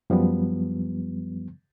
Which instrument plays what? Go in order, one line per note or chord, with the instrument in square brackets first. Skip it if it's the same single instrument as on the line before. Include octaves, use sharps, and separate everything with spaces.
[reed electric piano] F#2 F3 G3 B3